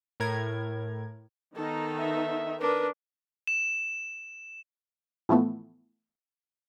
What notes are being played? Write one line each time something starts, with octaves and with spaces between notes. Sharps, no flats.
A2 A#4 G#6
D#3 B3 D#4 A4
E5
D4 A#4 B4
E7
A2 E3 F3 A3 B3